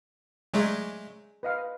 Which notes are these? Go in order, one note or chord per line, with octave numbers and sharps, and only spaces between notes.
F#3 G#3 A3 G#4 D5 G#5
B4 D#5 F5